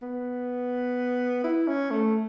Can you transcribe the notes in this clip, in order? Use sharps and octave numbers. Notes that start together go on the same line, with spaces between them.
B3
E4
C#4
A3